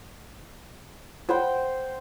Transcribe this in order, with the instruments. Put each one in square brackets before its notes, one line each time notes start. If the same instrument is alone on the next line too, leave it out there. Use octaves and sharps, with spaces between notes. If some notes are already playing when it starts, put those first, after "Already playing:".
[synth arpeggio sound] F4 C#5 B5 [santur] C5 F#5 G5